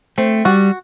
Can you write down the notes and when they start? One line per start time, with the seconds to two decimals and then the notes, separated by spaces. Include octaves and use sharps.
0.18 A3 C4
0.45 G3 F#4